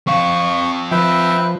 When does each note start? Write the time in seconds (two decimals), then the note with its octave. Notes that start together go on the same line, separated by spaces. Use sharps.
0.07 C4 F5 C#6
0.91 F3 B4 E5 G5